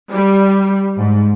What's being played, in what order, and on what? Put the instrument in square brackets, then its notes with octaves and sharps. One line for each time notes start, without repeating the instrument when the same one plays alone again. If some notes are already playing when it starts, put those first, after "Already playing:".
[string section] G3
G#2